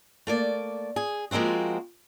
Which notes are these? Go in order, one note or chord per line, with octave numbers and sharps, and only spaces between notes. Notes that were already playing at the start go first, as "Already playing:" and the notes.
A3 A#3 D5
G#4
F3 G#3 A#3 C4 F#4